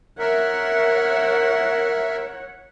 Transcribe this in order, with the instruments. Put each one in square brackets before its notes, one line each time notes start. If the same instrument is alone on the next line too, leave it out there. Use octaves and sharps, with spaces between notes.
[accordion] A#4 E5 [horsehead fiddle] C#5 F#5